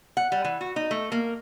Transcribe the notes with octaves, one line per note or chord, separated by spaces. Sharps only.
F#5
G3
E3
F#4
D#4
A3
A#3